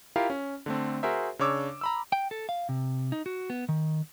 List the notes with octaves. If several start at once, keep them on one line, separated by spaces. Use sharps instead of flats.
E4 F4 G4 A#4 F5
C#4
D3 A3 C4
F#4 G#4 A#4 C5 E5
C#3 D4 C#5 D6 E6
A#5 B5 E6
G5
A4
F5
C3
D#4
F#4
B3
D#3